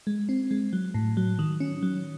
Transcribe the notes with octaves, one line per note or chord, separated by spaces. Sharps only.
G#3
C4
G#3
F#3
A2
F#3
D#3
C#4
F#3